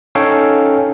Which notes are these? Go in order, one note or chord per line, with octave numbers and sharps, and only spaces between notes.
C#4 D#4 A4 C#5 F5 G5